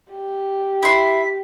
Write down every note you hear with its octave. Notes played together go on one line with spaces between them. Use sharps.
G4
E4 C6 B6